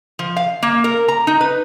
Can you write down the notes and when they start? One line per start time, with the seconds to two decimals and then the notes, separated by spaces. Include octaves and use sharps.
0.19 F3
0.36 F5
0.63 A#3
0.84 A#4
1.08 A#5
1.27 D#4
1.41 B4